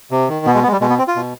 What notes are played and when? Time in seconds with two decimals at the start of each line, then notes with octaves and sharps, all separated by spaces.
0.11 C3
0.29 D#3
0.46 B2 B3
0.55 G#3
0.63 B3
0.68 G#3
0.72 G3
0.81 B2 G#3
0.90 B3
0.98 C4
1.08 F4
1.16 B2